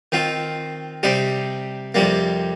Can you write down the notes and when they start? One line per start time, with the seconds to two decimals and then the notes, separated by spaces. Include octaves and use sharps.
0.12 D#3 C4 F4
1.03 C3 G3 D#4 G4
1.95 F2 C3 G3 A#3